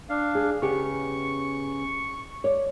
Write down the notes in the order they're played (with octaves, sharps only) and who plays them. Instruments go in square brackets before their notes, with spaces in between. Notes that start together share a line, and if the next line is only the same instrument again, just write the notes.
[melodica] D4 F5
[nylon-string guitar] G#4
[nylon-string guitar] C#3 B3 G4 [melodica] C#6
[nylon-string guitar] C#5 D5